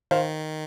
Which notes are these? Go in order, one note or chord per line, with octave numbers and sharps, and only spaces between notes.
D#3 C5 F5